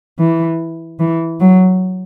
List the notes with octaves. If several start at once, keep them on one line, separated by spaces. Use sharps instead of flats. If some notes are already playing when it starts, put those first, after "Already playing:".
E3
E3
F#3